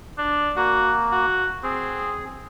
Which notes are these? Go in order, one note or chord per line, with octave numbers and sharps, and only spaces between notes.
D4
A#3 F#4
F#4
C4 G#4